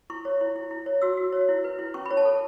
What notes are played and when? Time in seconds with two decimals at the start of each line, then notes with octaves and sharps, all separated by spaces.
0.10 E4 C#6
0.25 C#5
0.41 E4
0.56 E4
0.71 E4
0.86 C#5
1.02 F#4 E6
1.17 F#4
1.33 C#5
1.49 E4
1.64 B4
1.79 E4
1.94 C#4 C#6
2.06 B5
2.11 C#5
2.17 A5
2.25 A4